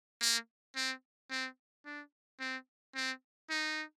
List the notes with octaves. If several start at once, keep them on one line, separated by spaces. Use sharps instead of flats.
A#3
C4
C4
D4
C4
C4
D#4